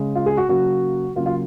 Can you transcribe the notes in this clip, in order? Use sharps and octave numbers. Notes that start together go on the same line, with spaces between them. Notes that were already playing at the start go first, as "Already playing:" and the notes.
Already playing: C#3 G#3
F4
G#4
F#4
C#3 F#3 A#3 F#4
C#3 F#3 A#3 F4
F4